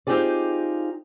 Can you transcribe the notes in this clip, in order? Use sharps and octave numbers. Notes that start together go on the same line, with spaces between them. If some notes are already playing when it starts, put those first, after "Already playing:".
C4 D#4 F4 G4 G#4 D5